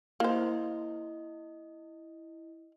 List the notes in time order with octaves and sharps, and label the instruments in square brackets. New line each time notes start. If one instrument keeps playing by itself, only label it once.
[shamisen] A#3 C5 [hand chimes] E4 D#5